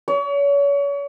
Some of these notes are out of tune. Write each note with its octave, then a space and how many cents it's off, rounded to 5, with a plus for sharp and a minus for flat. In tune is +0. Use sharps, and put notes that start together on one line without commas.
C#5 +35